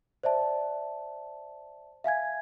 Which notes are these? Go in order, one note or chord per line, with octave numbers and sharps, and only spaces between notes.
C5 D5 E5 A5
E5 F5 G#5 G#6